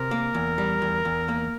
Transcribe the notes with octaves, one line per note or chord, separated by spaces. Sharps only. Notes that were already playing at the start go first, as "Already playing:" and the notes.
Already playing: C3 A#4
A#3
E2
G3
E2
E2
A#3